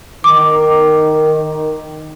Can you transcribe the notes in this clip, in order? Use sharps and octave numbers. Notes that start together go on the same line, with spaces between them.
D#3 D6